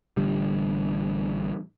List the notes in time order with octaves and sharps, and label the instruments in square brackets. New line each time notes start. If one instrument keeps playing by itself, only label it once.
[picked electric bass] A1 D3 G3